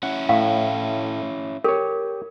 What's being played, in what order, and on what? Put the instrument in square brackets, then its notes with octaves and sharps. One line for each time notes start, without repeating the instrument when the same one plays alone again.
[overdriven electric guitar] C#4 E4 [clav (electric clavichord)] F#5
[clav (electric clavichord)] A2 [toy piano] F5
[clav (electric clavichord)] G4 C#5 [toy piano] A#4